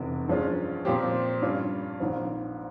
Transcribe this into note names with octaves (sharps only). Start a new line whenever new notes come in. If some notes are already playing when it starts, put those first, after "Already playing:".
Already playing: F1 E2 C3
G2 F3 G#3 C#4 F4
A#2 F3 C4 G4
G2 G3 C#4 F4
A#1 G#2 F3 C4